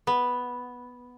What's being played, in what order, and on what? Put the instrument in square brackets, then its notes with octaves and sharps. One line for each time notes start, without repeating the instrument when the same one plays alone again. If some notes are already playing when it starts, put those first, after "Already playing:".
[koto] B3